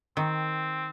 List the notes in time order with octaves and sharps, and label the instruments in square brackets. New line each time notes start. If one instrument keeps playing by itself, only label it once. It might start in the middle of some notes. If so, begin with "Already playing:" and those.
[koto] D#3 [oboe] C4